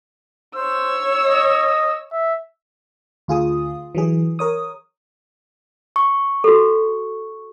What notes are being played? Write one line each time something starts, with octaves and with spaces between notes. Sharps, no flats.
C5 C#5 E6
D#5
E5
D2 F4 G#4 D#6
E3 F#3 G#4
A#4 C#5 D#6
C#6
F#4 A4